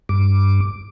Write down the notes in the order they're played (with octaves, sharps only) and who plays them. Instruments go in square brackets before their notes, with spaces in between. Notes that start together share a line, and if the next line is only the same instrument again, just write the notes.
[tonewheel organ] G2 D6